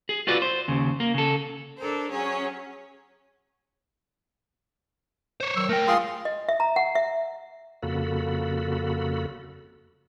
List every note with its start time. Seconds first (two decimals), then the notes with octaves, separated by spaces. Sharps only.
0.09 G#4
0.27 F4 F#4 B4 D5
0.42 C5
0.68 D#2 C#3
1.00 A#3
1.14 C#3 A4
1.79 D4 A4 A#4 C5
2.10 F#3 C#4 G#4 C#5
5.40 C5 C#5
5.56 D#3 F#3 E6
5.69 A3 A#4 G5
5.88 F4 G#4 C6
6.25 D#5
6.49 E5
6.60 A#5
6.76 F#5
6.95 E5
7.83 F2 C#3 A#3 F#4 A4 B5